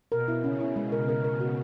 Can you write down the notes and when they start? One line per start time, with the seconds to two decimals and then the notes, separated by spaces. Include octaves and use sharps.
0.11 B2 A#4
0.28 E4
0.44 C#3 C#4
0.60 E4
0.76 G#3
0.92 A#4
1.08 A#4
1.24 A#4
1.40 F#4